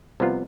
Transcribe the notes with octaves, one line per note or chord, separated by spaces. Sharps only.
C2 C3 F3 B3 F4